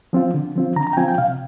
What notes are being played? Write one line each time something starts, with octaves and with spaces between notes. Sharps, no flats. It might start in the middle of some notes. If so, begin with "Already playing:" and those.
F3 C4 F4
D3
F3 C4 F4
D3 A#5
A#5
G5
F3 C4 F4 G#5
G5
C3 F5